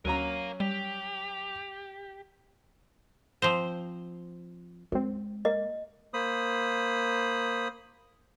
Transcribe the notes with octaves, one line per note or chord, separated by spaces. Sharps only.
D2 F#3 C#4 A#4 F5 A#5 D#7
G3 G4 F7
F3 C4 C5
F#2 G#3 C4
A#3 D#5
A#3 C5 B5 D#6